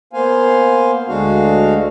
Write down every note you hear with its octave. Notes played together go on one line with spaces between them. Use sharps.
A#3 B3 C5 F5 G#5
D2 D3 G#3 D4 F#4 F5